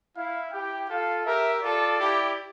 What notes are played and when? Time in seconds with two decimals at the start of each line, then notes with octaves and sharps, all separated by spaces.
0.16 E4 F5
0.52 E4 G4 G5
0.89 F4 A4 F5
1.26 G4 A#4 E5
1.63 F4 A4 D5
1.99 E4 G4